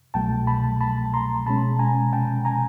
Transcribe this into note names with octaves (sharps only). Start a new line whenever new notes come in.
C2 B2 F#3 A3 G5 A5
A5 B5
A5 B5
A#5 C6
B2 G#3 C#4 A5 B5
G#5 A#5
G5 A5
G#5 A#5